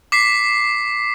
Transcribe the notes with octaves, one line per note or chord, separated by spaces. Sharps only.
D6 B6 C7